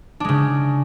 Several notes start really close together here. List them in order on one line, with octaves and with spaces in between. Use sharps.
D4 G#3 C#3